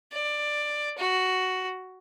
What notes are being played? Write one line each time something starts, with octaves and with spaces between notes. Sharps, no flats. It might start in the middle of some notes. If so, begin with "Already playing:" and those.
D5
F#4